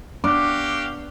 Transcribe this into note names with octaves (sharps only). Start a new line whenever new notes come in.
B3 D4 F#4 G4 F5 D6